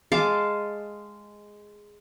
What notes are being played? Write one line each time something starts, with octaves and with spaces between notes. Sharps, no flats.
G#3 F5 A5 D6